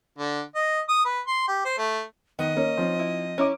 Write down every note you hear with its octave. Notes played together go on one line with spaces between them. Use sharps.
D3
D#5
D#6
B4
C6
G4
C5
A3
D#3 B3 D#5
A#3 C#4
F3 C4 D#4
E4
C#4 E4 A#5 D6